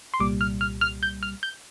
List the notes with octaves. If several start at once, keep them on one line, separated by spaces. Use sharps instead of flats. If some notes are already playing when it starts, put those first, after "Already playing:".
C6
C2 A#2 G3 D6
F6
F6
F6
G6
F6
G6